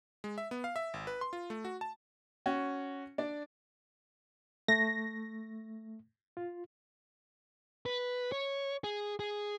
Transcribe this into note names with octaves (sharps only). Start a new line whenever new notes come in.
G#3
E5
B3
F5
E5
G#1
B4
C6
F4
A3
F#4
A5
C#4 F#4
D4 D5
A3 A#6
F4
B4
C#5
G#4
G#4